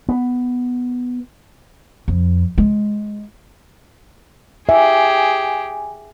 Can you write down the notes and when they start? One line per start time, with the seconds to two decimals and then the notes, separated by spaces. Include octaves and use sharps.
0.09 B3
2.08 F2
2.58 G#3
4.69 G4 G#4 E5 G#5